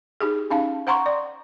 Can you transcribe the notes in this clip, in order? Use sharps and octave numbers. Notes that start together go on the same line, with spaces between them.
D#4 G4 G#4
C#4 D#4 F5 A5
C5 F#5 A#5 C6 C#6
D5